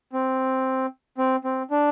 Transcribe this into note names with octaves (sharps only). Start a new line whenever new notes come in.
C4
C4
C4
D4